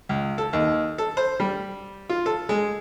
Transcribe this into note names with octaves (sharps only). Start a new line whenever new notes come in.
C#2
A4
D#2
A4
C5
G3
F4
A4
G#3